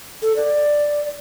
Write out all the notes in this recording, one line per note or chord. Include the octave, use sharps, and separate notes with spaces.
A4
D5